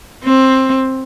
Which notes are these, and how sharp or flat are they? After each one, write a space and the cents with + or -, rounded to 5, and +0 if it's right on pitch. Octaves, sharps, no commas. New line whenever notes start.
C4 +15